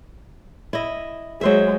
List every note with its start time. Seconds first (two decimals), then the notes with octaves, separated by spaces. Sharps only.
0.73 E4 D#5
1.41 F#3 G#3 C5 E5